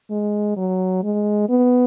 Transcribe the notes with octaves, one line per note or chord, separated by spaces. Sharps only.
G#3
F#3
G#3
B3